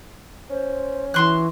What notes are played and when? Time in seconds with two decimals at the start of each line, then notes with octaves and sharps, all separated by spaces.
0.50 C#4 C5
1.14 E3 F#4 C6 F#6